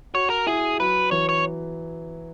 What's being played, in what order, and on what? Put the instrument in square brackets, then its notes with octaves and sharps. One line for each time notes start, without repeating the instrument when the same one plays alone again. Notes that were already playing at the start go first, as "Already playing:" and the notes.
[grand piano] F#4 [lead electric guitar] C#5
[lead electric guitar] A#4
[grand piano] E4 [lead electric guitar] G#4
[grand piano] F#3 [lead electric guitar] B4
[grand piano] E3 [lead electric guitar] C#5
[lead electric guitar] C#5